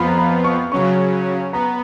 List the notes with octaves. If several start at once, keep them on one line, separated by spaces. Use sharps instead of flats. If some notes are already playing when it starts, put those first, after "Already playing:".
Already playing: F2 F3 B3 F4 B5
A#5
B5
C#6
C#3 F#3 C#4 C#6
B3 A#5